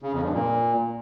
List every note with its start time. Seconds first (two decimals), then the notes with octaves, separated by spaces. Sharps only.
0.02 C#3
0.13 F2
0.23 G2
0.33 A#2